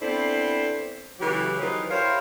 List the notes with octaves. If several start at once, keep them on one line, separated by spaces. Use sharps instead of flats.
B3 C4 D4 E4 A4 C5
C#3 E3 F#3 A3 G4
D#3 E3 F#3 D#4 B4 C5
E4 G4 A#4 C5 C#5 F5